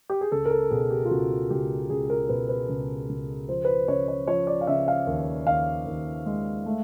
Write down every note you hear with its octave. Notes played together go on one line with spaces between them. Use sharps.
G4
G#4
C#2 A4
A#4
A4
B2 G#4
G4
F4
C#2 F#4
C#2 G4
C#2 G#4
A#4
B2 B4
B4
C#2
C#2
F3 C5
B4
C5
C#3 C#5
C#5
F3 C#5
D5
F5
C#3 E5
F5
D#2
D#2 F5
D#2
G#3
A3